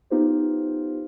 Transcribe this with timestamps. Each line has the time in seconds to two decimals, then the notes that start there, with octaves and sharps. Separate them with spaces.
0.10 B3 D#4 F4 G4 B4 C5